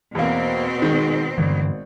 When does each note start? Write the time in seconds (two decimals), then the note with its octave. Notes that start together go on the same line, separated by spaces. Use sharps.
0.15 E2 B2 A#3 C4
0.82 D#3 G#3
1.38 G#1 G2 D3 E3